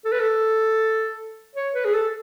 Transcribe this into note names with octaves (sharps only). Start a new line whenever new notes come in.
A4
B4
A4
C#5
B4
G#4
A4